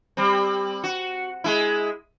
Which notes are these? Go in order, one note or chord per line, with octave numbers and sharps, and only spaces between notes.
G3 C4
F#4
G#3 E4